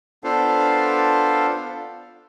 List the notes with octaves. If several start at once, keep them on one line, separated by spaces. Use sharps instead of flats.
B3 D4 F4 A4 C5 F5